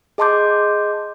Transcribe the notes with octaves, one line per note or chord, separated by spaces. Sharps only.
G#4 D#5 A5 C6 D6 G6